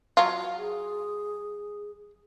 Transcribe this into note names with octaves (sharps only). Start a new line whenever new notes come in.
F#3 F4
G#4